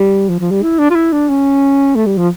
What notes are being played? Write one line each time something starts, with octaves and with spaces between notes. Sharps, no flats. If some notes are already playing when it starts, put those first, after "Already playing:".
Already playing: G3
F3
F3
G3
E4
D4
F4
E4
D4
C#4
A3
G3
F3